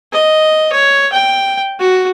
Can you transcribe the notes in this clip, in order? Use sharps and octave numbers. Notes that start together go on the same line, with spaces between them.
D#5
C#5
G5
F#4